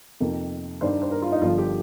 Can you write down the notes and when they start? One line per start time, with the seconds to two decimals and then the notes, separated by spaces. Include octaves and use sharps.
0.20 F2 C3 D#3 A#3
0.81 G2 D#3 G3 D4 C5
1.02 C5
1.11 A#4
1.22 F4
1.32 D#4
1.42 G1 G2 F3 F4
1.58 G4